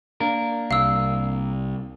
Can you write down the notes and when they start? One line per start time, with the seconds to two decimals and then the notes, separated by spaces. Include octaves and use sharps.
0.20 A#3 D4 A#4
0.71 C2 F5 E6